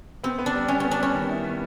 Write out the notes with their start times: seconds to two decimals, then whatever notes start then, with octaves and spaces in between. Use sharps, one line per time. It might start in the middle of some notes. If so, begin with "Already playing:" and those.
0.23 B3 C4
0.39 B3
0.46 D4
0.54 G3
0.68 B3 C#4
0.80 B3 C#4
0.91 D4
0.99 G3 C#4
1.15 D#3
1.29 E4
1.45 B3